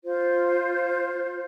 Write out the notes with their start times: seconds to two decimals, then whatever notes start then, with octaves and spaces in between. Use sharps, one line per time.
0.04 F4 C5